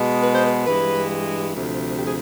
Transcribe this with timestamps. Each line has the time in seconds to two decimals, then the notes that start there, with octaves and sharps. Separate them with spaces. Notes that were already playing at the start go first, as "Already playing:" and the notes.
Already playing: B2 G#3
0.21 B4
0.34 C5
0.45 B4
0.65 G2 E3 G#3 B4
1.53 D2 C3 F3
1.97 G4
2.06 G#4